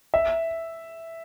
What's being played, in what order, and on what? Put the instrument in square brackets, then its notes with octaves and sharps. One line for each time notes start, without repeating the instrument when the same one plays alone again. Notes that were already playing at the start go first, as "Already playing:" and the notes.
[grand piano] E5